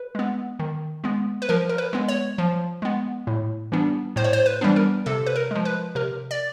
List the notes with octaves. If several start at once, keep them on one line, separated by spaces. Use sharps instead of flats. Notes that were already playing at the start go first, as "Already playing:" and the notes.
Already playing: B4
G#3 B3
D#3
G#3 B3
B4
F3 A#4
A#4
B4
G#3 B3
C#5
F3
G#3 B3
A2
E3 G3 B3 D4
A2 C5
C#5
C5
B4
E3 G3 B3 D4
A#4
C3 A4
B4
A#4
F3 G#3
B4
C3 A#4
D5